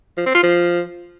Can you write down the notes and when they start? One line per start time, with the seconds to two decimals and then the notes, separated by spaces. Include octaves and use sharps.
0.18 F3
0.26 C4
0.35 F4
0.43 F3